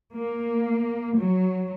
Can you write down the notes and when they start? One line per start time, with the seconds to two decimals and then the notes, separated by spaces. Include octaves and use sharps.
0.16 A#3
1.17 F#3